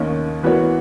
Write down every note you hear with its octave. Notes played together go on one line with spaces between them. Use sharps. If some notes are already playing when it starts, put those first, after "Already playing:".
Already playing: D#2 D#3 A#3 C#4
E3 B3 F#4 A#4 C#5